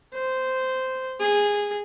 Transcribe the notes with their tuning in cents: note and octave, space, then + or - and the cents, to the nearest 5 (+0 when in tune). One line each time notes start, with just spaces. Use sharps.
C5 -10
G#4 -15